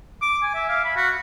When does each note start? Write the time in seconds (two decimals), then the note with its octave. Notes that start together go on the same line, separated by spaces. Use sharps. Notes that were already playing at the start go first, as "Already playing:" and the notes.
0.22 D6
0.43 G#5
0.55 E5
0.69 F5
0.85 B5
0.96 F#4